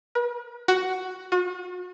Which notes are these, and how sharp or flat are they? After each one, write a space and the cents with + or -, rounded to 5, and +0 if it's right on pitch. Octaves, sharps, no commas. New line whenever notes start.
B4 -40
F#4 +10
F#4 -40